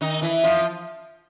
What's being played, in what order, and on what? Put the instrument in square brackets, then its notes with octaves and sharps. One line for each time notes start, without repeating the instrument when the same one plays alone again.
[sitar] D#3 D#4
E3 E4
F3 F4